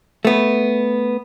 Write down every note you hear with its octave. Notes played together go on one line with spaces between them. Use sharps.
A3 B3